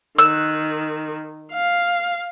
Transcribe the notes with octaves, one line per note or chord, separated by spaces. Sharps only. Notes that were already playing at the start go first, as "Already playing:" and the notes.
D#3 E6 F#6
F5